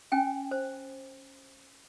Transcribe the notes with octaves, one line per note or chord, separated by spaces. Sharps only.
C#4 G5 G#5
C5